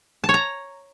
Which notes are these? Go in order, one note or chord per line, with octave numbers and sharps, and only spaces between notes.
A5
C#5
A#5